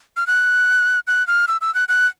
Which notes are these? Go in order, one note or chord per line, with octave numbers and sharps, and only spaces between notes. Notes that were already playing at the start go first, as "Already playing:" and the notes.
F6
F#6
F#6
F6
E6
E6
F#6
F#6